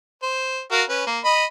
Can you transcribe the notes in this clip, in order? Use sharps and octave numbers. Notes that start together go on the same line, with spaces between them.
C5
F#4 A#4 F5
C#4 B4
A#3
D#5 B5